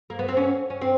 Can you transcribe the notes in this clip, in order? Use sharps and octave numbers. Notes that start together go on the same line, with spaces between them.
A#3
B3
C4
C#4
C#4
C4